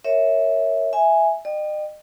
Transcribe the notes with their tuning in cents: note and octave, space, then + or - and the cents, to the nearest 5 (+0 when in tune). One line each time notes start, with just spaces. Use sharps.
A#4 -5 C#5 +0 E5 -10
E5 +0 G#5 +0
D#5 -45 G5 +0